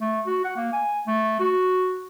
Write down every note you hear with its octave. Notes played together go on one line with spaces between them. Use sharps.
A3
F#4
F#5
A#3
G#5
A3
F#4